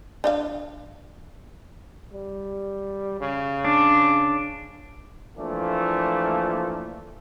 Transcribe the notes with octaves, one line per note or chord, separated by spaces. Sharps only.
D4 D#5 F5
G3
C#3
D4
E3 F3 A3 A#3 D4